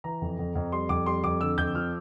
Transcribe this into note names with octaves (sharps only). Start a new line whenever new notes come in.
E3 A#5
F2
F2
F2
G3 C6
F2 D6
G3 C6
F2 D6
D3 E6
F2 G6
F3 F6